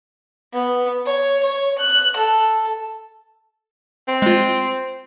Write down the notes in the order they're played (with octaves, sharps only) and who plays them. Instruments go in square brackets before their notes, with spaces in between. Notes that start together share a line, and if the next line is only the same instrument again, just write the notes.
[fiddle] B3
C#5
C#5
F#6
A4
[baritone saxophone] C4
[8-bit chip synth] G#3 F4